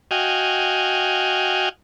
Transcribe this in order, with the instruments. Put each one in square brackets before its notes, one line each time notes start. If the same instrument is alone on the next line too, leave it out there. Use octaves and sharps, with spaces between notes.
[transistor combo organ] F#4 D#5 F5 G5 G#5